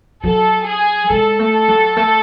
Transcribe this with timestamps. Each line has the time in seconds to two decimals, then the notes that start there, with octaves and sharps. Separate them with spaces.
0.24 F#3 A4
0.67 G#4
1.10 G#3 A4
1.39 A3
1.68 F#3
1.97 A3